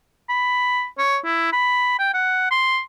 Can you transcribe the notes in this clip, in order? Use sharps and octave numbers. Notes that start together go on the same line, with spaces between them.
B5
C#5
E4
B5
G5
F#5
C6